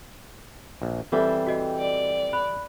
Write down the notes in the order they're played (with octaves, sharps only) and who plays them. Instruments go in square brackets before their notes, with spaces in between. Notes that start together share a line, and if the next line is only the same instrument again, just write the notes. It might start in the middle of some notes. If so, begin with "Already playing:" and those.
[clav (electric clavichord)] A#1
[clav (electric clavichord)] E3 G3 [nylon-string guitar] C4 A4 E5
[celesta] F#4 D#5 G5
[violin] D5
[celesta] B5 F#6